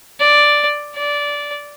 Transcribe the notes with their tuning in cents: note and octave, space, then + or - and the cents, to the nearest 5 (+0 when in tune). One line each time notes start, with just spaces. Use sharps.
D5 +0
D5 -15